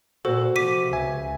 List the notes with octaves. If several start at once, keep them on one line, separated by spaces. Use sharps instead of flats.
A#2 F#4 A4 C5
C3 F3 D6 B6 D#7
C#2 C#3 E5 G#5